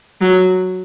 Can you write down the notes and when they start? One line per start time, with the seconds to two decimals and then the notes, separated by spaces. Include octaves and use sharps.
0.21 F#3